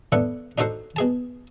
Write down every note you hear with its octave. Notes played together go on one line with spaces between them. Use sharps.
B3 D4 E4 A4 D5 F#5
D4 D#4 F#4 A4 C5
B2 G#4 A5